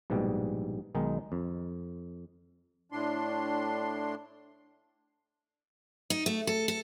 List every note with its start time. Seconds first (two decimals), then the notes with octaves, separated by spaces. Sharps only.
0.10 A#1 G#2 B2 G3
0.95 B1 D#3 G#3 D#4
1.32 F2
2.92 A2 D4 C6
6.10 D#4
6.26 A3
6.47 A4
6.68 A4